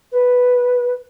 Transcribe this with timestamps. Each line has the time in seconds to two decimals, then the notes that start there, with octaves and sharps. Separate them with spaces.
0.12 B4